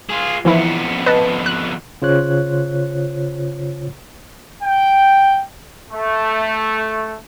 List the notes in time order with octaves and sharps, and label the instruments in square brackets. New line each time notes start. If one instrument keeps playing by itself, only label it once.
[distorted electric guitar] F4 G#4
[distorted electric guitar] F2 B3 [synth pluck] E3 F3 E4
[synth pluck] B4 D#5 A5
F#6
[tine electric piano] C#3 F4 C5 C#5 F#6
[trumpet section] G5
A3